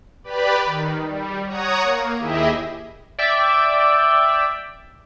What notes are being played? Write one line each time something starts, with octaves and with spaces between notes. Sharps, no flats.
G4 B4 D5 B5
D#3
G3
C#5 F#5 A#5 D#6
A#3
D#2 E4 G4 G#4 D#5 E5
D5 E5 G5